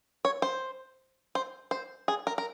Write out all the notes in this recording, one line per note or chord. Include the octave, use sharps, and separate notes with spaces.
C#5
C5
C5
C5
G#4
A#4
A#4